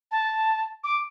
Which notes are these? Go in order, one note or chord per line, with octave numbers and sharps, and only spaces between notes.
A5
D6